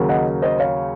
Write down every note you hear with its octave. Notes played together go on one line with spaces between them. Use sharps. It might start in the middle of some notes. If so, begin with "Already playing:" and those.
Already playing: D#2 C#3 F#3 A#3
D#5 F#5
C5 D#5
C#5 F5